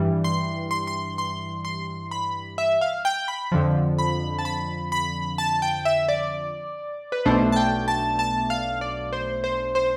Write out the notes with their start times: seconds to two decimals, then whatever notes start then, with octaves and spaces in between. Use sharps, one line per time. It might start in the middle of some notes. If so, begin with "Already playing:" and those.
Already playing: G2 E3 G3
0.24 C6
0.71 C6
0.87 C6
1.18 C6
1.65 C6
2.11 B5
2.58 E5
2.81 F5
3.05 G5
3.28 B5
3.52 F2 D3 F3
3.98 B5
4.39 A5
4.45 B5
4.92 B5
5.38 A5
5.62 G5
5.85 E5
6.08 D5
7.12 B4
7.26 B1 B2 A3 D4 C5
7.52 A5
7.56 G5
7.88 A5
8.19 A5
8.50 F5
8.81 D5
9.13 C5
9.44 C5
9.75 C5